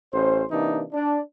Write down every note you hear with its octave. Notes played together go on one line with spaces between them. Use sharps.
A1 C#4 C5
C3 E3 A#3 D4 D#4
D4